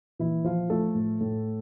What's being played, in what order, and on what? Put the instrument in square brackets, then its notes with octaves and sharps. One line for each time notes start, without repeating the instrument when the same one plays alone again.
[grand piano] A#2 E3 E4
F3 F4
F3 A3 A4
A2
A2